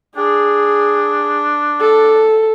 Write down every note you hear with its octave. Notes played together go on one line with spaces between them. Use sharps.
D4 G#4
A4